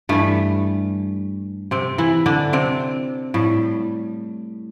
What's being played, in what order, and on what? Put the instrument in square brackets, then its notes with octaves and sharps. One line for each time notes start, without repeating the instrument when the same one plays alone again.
[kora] G2 E3 G3 A3
C3 C4
E3 E4
D3 D4
C3 C4
A2 G3